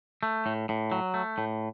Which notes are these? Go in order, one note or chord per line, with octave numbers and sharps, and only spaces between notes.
A3
A2
A2
F#3
A3
A2